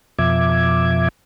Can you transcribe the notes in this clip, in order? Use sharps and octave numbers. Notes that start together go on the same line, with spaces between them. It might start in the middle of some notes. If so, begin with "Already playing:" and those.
F2 B2 F3 E5 D6 G#6